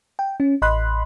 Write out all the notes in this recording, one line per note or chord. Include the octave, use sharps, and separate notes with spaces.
G5
C#4
A1 D#5 B5 C6 F#6